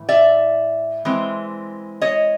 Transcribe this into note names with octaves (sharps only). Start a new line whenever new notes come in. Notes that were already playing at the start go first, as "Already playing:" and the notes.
Already playing: A2 E3
D5 E5
E3 G#3 C4
C#5 D#5